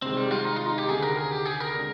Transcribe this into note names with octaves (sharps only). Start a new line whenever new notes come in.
C3 D#3 G#3 C4
G3
F4
D#4
F4
D#4
G4
D2 C3 D#3 G#4
A#4
G#4
G4
G#4
A#4
D3 G#3